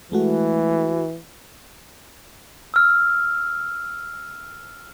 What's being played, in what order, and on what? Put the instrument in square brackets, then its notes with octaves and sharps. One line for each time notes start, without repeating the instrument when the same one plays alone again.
[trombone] E3 [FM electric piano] G#3 A3 F#4
[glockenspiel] E6 F6